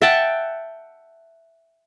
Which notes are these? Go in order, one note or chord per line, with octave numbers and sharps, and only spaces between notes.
E5 F#5 G5 A5